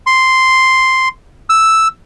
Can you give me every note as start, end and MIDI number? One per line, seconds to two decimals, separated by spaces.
0.06 1.08 84
1.50 1.88 88